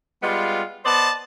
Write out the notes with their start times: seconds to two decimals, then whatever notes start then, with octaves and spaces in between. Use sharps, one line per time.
0.22 G3 G#3 B3 F4
0.84 B3 C5 D5 D#5 A5